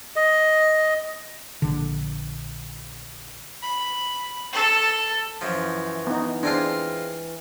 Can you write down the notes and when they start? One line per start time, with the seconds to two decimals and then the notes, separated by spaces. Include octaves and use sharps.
0.16 D#5
1.62 A#1 D3
3.62 B5
4.53 A4
5.41 F#2 E3 F3
6.07 B3 D#4
6.43 G#3 C4 D4 F4